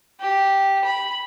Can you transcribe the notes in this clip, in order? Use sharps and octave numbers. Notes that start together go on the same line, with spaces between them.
G4
B5